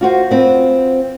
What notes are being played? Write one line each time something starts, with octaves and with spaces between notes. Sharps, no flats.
F4 F#4 C5
B3 C4 F4